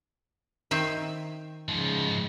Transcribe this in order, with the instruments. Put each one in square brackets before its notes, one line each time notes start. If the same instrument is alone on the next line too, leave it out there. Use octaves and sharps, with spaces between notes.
[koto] D#3 C4 E5
[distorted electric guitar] G#2 F3 [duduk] C#3